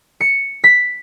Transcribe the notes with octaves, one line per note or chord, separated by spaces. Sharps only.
C#7
B6